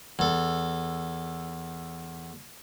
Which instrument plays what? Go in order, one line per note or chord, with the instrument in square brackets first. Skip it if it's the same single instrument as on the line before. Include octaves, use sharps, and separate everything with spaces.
[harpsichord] E2 A4